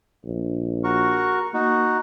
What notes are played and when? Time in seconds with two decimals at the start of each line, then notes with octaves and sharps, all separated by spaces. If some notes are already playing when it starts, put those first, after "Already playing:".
0.25 A#1
0.84 F#4 A#4 C#6
1.54 A#3 D#4 F#4